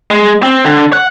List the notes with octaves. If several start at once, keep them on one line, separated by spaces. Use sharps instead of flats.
G#3
C4
D3
F#5